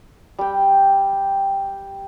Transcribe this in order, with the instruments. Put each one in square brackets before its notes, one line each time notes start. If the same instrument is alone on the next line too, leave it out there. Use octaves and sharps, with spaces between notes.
[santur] G3 G5